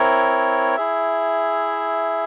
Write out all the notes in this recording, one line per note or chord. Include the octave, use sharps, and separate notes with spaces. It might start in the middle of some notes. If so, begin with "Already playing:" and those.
Already playing: C4 E4 A#4 C#5
E4 G#4 E5